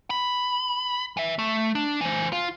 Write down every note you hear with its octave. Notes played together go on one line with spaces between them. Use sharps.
B5
E3 E5
A3
D4
E3 C5
F4